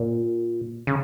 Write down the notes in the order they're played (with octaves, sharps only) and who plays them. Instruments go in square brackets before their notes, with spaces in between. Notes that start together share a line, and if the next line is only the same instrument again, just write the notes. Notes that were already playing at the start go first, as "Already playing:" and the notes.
Already playing: [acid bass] A#2
C#3